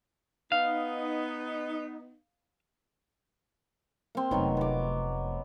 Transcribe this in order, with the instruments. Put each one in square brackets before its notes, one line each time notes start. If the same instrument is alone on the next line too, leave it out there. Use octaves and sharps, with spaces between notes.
[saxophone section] B3 D#4 [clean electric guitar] F5
[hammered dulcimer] A#3 C4
[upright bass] F1 A3 [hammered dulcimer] D#3 F#3 B3
[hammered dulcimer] B3 D6